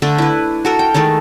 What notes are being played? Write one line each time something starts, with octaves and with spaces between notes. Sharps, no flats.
D3 A3 D4
E4 B4
F#4 A4 A#4
G5
D#3 G#3 A3 A4